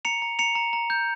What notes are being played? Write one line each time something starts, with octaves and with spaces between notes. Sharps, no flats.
A#5 C#7 F7
A#5
A#5 C#7 F7
A#5
A#5
G6